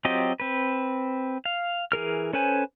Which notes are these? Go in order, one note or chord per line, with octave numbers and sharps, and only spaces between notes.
F#3 C4 F4 G4 D#5
C4 B4
F5
E3 G#4 A#4 F6
C#4 A4 B4 C5 G#5